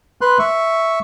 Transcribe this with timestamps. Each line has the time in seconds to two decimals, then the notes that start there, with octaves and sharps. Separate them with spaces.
0.21 B4 C6 F#6
0.39 E5 C#6